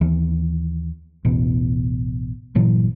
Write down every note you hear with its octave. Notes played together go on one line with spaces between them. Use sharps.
D#2 E3
A1 E2 B2
G1 A#2 E3 F#3